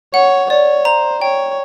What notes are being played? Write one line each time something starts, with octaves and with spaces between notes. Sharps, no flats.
C#5 F#5
C#5 D5
C5 A#5
C#5 G5